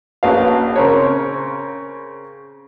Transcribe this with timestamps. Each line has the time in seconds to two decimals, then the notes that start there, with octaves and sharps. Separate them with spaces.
0.23 A#1 C#4 F#4 B4 F5
0.76 C#3 C4 A#4 C#5